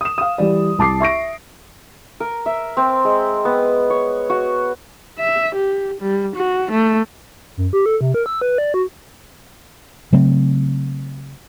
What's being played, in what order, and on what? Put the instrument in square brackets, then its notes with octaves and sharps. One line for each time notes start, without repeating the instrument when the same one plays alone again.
[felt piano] D#6 E7
F5 D#6
E3 G3 D5
C2 A5 D6 C7
E5 C#6 A#6 D7
[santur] A#4
E5
C4
G#3
B3
C#5
F#4
[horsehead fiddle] E5
G4
G3
F#4
A3
[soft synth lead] F#2
G4
A4
C3
A#4
E6
B4
D5
F#4
[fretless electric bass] C#3 F#3 A3 C4